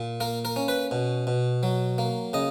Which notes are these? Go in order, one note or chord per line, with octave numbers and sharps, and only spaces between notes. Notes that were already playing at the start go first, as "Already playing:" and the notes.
Already playing: A#2
A#3 A#4
A#4
C#4
B4
B2
B2
F#3
A#3
C#3 D#5